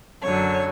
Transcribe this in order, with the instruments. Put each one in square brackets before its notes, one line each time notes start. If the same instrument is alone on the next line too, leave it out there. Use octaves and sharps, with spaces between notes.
[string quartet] F#2 D3 F#3 C#5